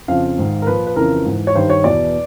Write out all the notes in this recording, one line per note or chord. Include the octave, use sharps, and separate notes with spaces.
F2 C#3 F3 F5
G#2 D#3
A#4
A#2 F3 B4
B4
F2 C#3 E3 A#4
G#2 E3
C#5
G2 D#3 C5
C#5
E2 B2 D5